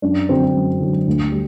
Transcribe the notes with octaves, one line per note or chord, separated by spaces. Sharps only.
F#2 D4
D3 F#3 C4
F#2
D3 F#3
D2
G3